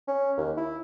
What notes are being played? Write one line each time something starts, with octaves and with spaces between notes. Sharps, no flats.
C#4
D#2
E4